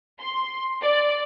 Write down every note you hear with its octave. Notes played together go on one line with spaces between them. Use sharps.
C6
D5